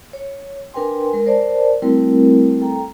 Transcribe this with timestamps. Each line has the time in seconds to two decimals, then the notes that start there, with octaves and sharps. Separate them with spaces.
0.13 C#5
0.74 D4 A#4 B4 G5 G#5 C6
1.13 G#3 A#4
1.25 A#4 C5 D5 A5
1.82 G3 A3 C4 E4 F#4 A#4
2.61 A4 G5 A#5